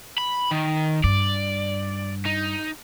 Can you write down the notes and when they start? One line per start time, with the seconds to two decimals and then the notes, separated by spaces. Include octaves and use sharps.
0.18 B5
0.51 D#3
1.04 G2 D5
2.26 D#4